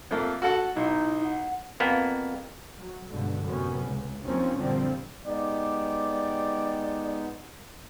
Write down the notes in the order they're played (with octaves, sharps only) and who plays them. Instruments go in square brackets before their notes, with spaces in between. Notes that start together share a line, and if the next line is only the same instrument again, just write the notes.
[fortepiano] F2 A3 A#3
F#4 A4 F#5
[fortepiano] B1 [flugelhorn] D#4 [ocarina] E4
[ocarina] F#5
[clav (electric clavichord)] F2 A#3 B3
[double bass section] F#3
C#2 G2 B2 D3
F#2 A2 C3 B3 C#4
C#2
D#2 F3 A#3 C4 C#4
F#2 A#2 D3 F3 G3 C4
[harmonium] G#3 B3 D#4 [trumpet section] G4 D5